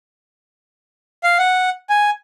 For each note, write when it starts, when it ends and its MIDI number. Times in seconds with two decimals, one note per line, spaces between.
1.24 1.38 77
1.39 1.70 78
1.90 2.10 80